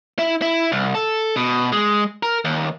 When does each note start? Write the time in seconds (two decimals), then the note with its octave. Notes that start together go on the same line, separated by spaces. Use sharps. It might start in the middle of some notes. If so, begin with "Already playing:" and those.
0.19 E4
0.42 E4
0.72 C2
0.95 A4
1.37 B2
1.72 G#3
2.23 A#4
2.45 D#2